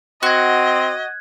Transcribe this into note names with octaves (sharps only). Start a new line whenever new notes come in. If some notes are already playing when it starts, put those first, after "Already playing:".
C4 F#4 D#5 F#6 G#6